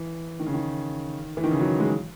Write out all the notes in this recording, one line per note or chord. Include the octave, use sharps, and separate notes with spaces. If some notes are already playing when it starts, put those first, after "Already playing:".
Already playing: E3
D#3
C#3
D#3
E3
D#3
C#3
F#3
G#3